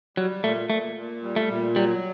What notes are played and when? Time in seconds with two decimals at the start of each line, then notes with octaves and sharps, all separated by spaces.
0.17 F#3 G3
0.43 A#2 A3
0.70 A#2 A3
0.96 A#2
1.23 G3
1.36 A3
1.49 A#2
1.75 F#3 G3